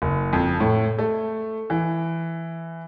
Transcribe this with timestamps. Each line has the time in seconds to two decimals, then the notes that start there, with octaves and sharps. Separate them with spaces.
0.02 F#1
0.33 F2
0.60 A2
0.99 A3
1.70 E3